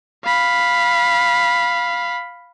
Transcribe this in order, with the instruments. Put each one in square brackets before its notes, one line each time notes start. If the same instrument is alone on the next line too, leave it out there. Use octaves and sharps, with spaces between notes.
[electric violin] F5 B5